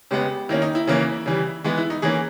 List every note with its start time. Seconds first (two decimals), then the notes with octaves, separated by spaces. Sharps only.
0.11 C#3 G#3 B3 G4
0.49 D#3 A#3 C#4 E4
0.62 D#4
0.75 E4
0.87 C#3 E3 A#3 C#4
1.26 C#3 E3 G3
1.64 E3 G#3 B3
1.78 E4
1.90 D#4
2.02 E3 A#3 C#4 G#4